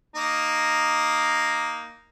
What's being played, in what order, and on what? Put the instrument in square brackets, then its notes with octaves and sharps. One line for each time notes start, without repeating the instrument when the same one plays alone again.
[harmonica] A#3 D#4